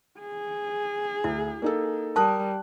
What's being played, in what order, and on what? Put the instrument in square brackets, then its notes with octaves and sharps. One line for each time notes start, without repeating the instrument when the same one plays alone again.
[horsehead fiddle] G#4
[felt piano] D2 [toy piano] E4
[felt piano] A#3 D#4 A4
[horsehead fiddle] G3 [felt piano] A#4 D#6 F#6 [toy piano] A5